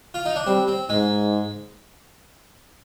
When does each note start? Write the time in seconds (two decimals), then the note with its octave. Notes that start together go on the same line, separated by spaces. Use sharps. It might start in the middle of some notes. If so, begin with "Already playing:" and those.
0.14 F4
0.25 D#4
0.36 D4
0.47 G3 C4
0.68 C4
0.89 G#2 G#3